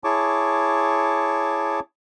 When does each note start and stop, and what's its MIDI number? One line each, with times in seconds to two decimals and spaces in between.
0.04 1.80 64
0.04 1.80 68
0.04 1.80 73
0.04 1.80 81
0.04 1.80 85
0.04 1.80 86